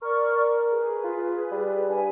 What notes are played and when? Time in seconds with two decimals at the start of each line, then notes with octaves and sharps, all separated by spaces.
0.02 A#4 D5 C#6 F6
0.70 G#4 B4
1.04 F4
1.52 G3
1.89 G2 B4 G#5